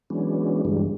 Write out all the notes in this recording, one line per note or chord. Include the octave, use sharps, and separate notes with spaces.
E3 F#3 G#3 B3 C#4 D4
G2 D3 E3 G3 G#3